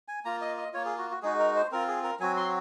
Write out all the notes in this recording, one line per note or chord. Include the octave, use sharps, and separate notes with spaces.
G#5
A#3 F4 A#5
D#5
D#5
A#3 F4 C#5
G#4
F#4
F#4
G#3 D#4 F#4 G#4
A#4
C5
C4 F4 A#4
G#4
A#4
F#3 C4 F#4 G#5
C6